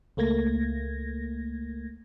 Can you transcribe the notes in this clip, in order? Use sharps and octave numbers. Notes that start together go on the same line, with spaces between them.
C#2 A3 A#3 G#6 A#6